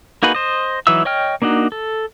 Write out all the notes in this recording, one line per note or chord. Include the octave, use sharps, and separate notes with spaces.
A#3 D#4 F#4 G#4 B4
C5 D#5
E3 F#3 D#4 E5 E6
C#5 D#5 G5 F6
A#3 D4 D#4 F#4
A4